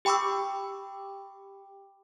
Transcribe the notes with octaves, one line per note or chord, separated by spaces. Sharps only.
G4 G5 B5 C#6 D6 E6